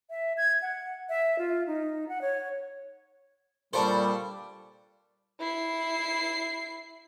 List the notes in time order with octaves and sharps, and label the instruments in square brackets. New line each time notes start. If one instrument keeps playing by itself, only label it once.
[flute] E5
G#6
F#5
E5
F4
D#4
F#5
C#5
[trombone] A#2 [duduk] G3 [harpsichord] D4 C5 [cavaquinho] A4 B5 C#6
[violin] E4 C7